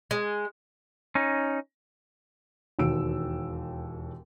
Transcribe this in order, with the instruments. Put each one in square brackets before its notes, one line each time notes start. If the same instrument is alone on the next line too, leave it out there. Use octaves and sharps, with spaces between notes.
[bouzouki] G#3
[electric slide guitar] C#4 D#4
[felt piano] E1 D#2 F#4 E6 D7